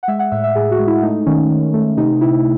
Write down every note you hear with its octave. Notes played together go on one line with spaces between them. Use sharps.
F#5
G#3 E5
F#5
A2 E5
E5
A2 G#4
F#4
G#3
E4
A3 D#4
D#3 C#4
D#3
A3
C3 D#4
C3 E4